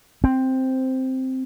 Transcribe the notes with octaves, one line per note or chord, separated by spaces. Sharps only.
C4